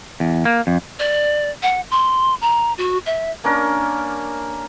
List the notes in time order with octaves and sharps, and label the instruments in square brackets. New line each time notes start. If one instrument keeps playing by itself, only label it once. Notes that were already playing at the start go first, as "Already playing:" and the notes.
[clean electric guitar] E2
A#3
F2
[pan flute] D5
F#5
C6
A#5
F#4
E5
[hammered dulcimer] A#3 C#4 D4 A#4